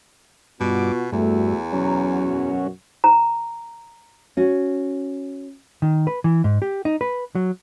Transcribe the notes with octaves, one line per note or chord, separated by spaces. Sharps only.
G2 B2 B3 F4 F#4 D6
E2 G2 A3 F#4 E5
B2 F#3 C#4 A#5
F#2 B2 F#4
A#5
C#4 F#4
D#3
B4
E3
G#2
G4
D#4
B4
F#3